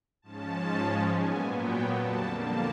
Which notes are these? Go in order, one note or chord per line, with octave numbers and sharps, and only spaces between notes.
G#2 F3 G#3 C#4 A5
A#2 F#3 B3 G#5
G5
F2 D3 G3 A#3 A5
A5